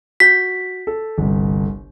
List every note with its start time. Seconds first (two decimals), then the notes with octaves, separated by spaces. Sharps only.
0.20 F#4 G6 B6
0.87 A4
1.18 G1 C2